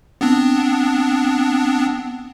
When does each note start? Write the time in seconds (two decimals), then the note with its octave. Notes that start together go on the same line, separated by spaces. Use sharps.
0.21 B3 C4 D4